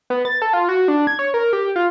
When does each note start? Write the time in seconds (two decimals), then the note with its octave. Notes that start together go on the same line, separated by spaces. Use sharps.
0.10 B3
0.25 A6
0.42 A4
0.53 F4
0.69 F#4
0.88 D4
1.07 G#6
1.19 C#5
1.34 A#4
1.53 G4
1.76 F4